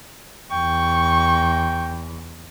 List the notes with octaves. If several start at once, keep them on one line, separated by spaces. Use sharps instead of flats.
E2 G5 C#6